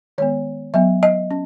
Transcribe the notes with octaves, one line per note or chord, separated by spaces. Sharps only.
D#3 G#3 B3 C#5
F#3 B3 E5
D#5
C#4